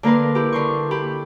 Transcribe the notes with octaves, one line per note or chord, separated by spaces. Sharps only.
D3 A#3 A#4 B4 C6
E4 G4
D3 C6 C#6
G4 B5